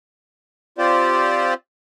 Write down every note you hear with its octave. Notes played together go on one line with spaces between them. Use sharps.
C4 F4 G4 C5 D5